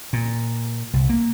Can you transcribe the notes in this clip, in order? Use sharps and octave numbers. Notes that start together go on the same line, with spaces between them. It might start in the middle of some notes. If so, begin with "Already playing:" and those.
A#2
C2
A#3